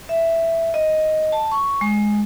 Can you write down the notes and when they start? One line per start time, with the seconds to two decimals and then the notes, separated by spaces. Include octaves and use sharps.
0.09 E5
0.74 D#5
1.32 A5
1.52 C#6
1.81 G#3